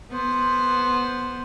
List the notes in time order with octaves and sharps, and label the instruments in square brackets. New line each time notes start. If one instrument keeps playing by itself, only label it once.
[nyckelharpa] B3 C5